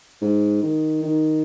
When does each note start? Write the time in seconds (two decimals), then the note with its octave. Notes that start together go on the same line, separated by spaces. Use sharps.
0.21 G#2
0.62 D#3
1.03 D#3